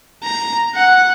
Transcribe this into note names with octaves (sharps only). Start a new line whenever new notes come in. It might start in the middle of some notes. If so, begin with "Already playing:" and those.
A#5
F#5